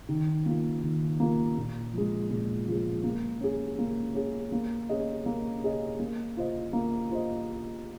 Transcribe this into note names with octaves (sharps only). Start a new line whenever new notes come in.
D#3
A#3 F4
D#3
A#3 F4
A#2
F3 G#3
A#2
F3 G#3
A#3
C#4 G#4
A#3
C#4 G#4
A#3
C#4 G#4 D#5
A#3
C#4 G#4 D#5
A#3
F4 C5 D#5
A#3
F4 C5 D#5